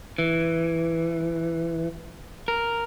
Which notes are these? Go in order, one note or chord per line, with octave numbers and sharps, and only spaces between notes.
E3
A#4